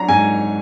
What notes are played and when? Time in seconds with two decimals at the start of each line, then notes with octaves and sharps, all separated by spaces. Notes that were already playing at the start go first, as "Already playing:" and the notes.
Already playing: F#3 D4 A#5
0.08 G#2 G#5